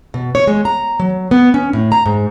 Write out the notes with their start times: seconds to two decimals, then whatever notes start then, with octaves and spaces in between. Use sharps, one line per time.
0.14 B2
0.35 C#5
0.47 G#3
0.65 A#5
1.00 F#3
1.31 B3
1.54 C#4
1.73 A2
1.92 A#5
2.06 G#2